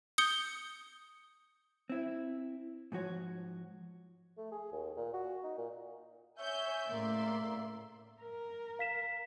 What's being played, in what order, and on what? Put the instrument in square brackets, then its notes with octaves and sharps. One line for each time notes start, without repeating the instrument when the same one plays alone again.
[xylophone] D#6 G6 C#7 G7
[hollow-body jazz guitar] C4 E4
G#2 F3 F#4 C#5
[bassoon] A3
G#4
D#2
A#2
F#4
D#4
A#2
[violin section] C#5 G#5 G6 [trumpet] E5
[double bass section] A2 C#3 [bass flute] A#3 [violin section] D5 C6
[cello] A#4
[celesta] F5 B6 E7